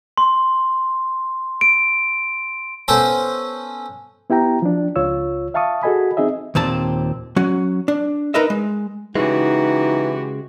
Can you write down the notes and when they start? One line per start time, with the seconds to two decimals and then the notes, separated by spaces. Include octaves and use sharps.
0.18 C6
1.61 D7
2.88 B3 C#4 A4 C5
4.30 B3 E4 G4 G5 A#5
4.62 F3 D4
4.96 C#2 F4 C#5 E6
5.54 E5 F5 A5 C#6 D#6
5.83 F#4 G#4 A4 D#5 G#5 B5
6.17 C4 D#4 G#4 D#5 E5
6.55 D#2 A#2 C4 A5
7.36 F#3 C#4 F#4
7.88 D4
8.34 D#4 A#4 B4 D#5 E5
8.50 G#3
9.15 C#3 E3 G#3 D#4 F#4 G4